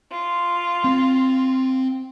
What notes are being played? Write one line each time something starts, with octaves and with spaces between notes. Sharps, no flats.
F4
C4